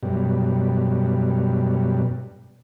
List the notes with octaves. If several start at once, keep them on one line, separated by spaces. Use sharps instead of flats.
F#2 B2 G3